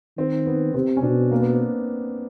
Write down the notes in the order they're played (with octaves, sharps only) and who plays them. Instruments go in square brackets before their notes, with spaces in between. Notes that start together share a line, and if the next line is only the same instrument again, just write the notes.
[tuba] D#3 [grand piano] C4
[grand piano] B3
[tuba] C3 [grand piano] C4
[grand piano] C#4
[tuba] B2 [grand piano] D4
[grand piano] A#3
B3
C4